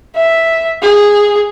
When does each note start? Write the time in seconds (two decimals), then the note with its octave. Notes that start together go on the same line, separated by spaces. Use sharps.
0.16 E5
0.82 G#4